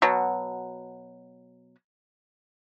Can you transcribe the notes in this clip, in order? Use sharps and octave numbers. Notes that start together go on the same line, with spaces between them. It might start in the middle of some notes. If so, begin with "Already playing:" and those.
B2 F#3